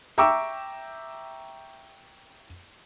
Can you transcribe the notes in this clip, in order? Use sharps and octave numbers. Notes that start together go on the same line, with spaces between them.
E5 G5 A#5 C#6 D6 E6